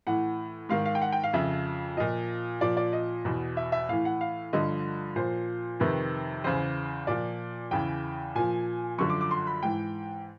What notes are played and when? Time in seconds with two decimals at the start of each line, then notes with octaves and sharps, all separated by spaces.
0.07 A2 E3 F#5
0.69 G#2 D#3 F5
0.85 F5
0.95 G5
1.02 F#5
1.12 G5
1.24 F5
1.33 F2 C#3 F3 E5
1.97 A#2 F3 D#5
2.61 A#2 F3 D5
2.77 D5
2.93 D#5
3.25 E2 B2
3.57 E5
3.72 E5
3.89 A2 E3 F5
4.05 F#5
4.21 F5
4.53 G2 D3 F3 D#5
5.16 A#2 F3 C5
5.80 F2 C3 D#3 B4
6.44 E2 C#3 E3 C5
7.07 A#2 F3 D5
7.71 E2 C#3 E3 G5
8.35 A#2 F3 G#5
8.98 F#2 D3 F3 C#6
9.10 D6
9.21 D6
9.31 C6
9.47 B5
9.63 G#2 E3 G5